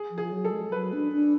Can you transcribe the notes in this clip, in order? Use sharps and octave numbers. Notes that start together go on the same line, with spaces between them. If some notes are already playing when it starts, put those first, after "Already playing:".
Already playing: G#4
F3
G#4
F#3
A4
G#3
F#3 B4
D4
D4